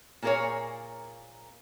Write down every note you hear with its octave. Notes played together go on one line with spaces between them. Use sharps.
A#2 A#3 G#4 A#4 C5 C#5